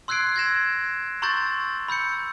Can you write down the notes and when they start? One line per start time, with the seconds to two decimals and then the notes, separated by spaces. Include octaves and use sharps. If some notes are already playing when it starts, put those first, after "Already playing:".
0.08 C6 E6 F#6 G#6 C7 D7
0.36 G#6 A#6 E7
1.22 A#5 C6 C#6 E6 G6 A6
1.88 B5 E6 G6 C#7